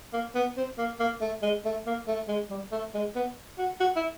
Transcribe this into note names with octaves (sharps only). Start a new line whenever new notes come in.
A#3
B3
C4
A#3
A#3
A3
G#3
A3
A#3
A3
G#3
G3
A3
G#3
B3
F#4
F#4
E4